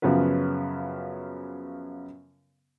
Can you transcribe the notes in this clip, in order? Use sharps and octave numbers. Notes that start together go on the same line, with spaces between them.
F#2 C#3 F3 B3 B4